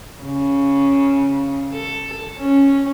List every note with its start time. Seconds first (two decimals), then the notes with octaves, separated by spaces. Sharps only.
0.23 C#3
1.73 A4
2.38 C#4